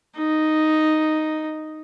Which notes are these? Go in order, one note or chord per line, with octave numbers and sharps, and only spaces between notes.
D#4